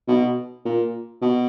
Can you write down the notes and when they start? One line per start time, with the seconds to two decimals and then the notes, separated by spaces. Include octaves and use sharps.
0.08 B2
0.66 A#2
1.22 B2